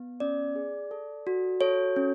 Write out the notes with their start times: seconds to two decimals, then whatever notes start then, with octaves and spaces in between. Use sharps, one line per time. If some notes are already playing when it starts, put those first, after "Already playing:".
Already playing: B3
0.20 C#4 D5
0.56 G#4
0.91 A4
1.27 F#4
1.61 A4 C#5
1.96 C#4